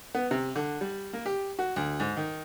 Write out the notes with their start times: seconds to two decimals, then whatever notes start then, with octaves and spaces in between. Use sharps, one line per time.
0.15 B3
0.31 C3
0.56 D3
0.81 G3
1.13 A#3
1.26 G4
1.59 F#4
1.76 D2
2.00 G#2
2.17 D#3